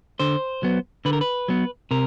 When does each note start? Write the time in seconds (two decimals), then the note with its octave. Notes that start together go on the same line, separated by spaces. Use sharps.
0.19 D3 C5
0.63 F#3 B3
1.05 D3 B4
1.13 A#4
1.21 B4
1.48 F#3 B3
1.91 C3 A#4